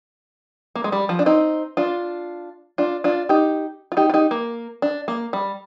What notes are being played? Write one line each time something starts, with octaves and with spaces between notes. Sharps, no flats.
A#3
G#3
G3
F3
D4
C4 D#4
D4 F4
D4 F4
D4 F4
D#4 G4
F4
D#4 G4
F4
D#4 G4
A#3
D4
A#3
G3